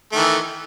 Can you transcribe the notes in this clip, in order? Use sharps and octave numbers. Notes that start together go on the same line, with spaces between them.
D#3 E3 A3